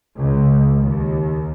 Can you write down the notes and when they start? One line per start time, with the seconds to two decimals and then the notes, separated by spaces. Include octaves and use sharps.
0.17 C#2
0.75 D#2